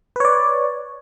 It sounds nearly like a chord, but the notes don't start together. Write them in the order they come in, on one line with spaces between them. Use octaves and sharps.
B4 C#5 D5